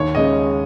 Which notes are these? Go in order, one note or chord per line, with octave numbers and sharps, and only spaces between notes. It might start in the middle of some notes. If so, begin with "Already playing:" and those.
Already playing: D#2 C#5
C#3 G#3 C#4 D#5